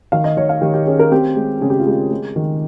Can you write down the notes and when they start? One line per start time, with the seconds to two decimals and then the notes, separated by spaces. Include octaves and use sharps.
0.12 D#3 F5
0.24 D#5
0.37 D#3 C#5
0.49 F5
0.61 D#3 G4
0.74 G4
0.87 C#4 G#4
0.99 A#4
1.12 C4 G4
1.36 G#3
1.61 C#3 G#4
1.70 G4
1.80 F4
1.87 G#3 G4
2.10 G#3
2.36 D#3